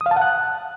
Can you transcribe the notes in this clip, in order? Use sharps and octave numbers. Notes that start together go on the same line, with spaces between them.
D#6
F5
A5
F#5
F#6